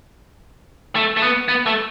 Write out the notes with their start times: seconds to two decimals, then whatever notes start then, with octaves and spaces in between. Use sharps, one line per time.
0.95 A3
1.17 A3
1.22 B3
1.48 B3
1.66 A3